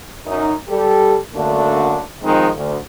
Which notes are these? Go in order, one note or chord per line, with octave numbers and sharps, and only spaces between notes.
F#2 D#4
G3 G4 A4
F#2 D3 A3 A#3 D4 F#4
D#3 F3 G#3 C4 D#4
D2